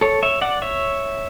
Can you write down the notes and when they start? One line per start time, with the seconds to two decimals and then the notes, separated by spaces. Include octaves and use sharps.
0.01 A4 C#5
0.23 C#5 E5
0.41 D5 F#5
0.62 C#5 E5